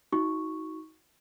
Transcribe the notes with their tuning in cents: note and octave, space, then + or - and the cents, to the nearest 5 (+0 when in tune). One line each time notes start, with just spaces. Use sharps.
D#4 +35 F#4 +0 C#6 +0